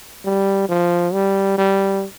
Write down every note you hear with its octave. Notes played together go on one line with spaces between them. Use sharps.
G3
F3
G3
G3